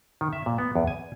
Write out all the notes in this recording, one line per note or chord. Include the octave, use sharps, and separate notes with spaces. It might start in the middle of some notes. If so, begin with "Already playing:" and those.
D#3
E5
A#2
B3
E2
G#5